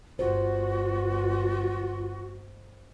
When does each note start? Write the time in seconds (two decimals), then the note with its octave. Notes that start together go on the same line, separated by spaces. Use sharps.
0.19 G1 F4 F#4 C5